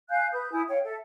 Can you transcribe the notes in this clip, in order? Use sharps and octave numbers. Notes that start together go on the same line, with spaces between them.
F5 G#5 F#6 G6
B4 D#6 G6
E4 G#5 D#6
C#5 F5 G5
A4 E5